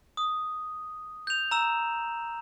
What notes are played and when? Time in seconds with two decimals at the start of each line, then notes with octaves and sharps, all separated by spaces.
0.17 D#6
1.27 G6 F7
1.51 A#5 E6 E7